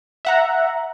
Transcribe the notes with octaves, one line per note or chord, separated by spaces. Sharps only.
E5 F#5 A#5